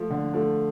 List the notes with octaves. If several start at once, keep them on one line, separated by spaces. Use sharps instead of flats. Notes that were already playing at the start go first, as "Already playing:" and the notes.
Already playing: F3 A3
D3
F3 A3